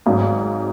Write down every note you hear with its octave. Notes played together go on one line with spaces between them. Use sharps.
G#1 G#2 F#3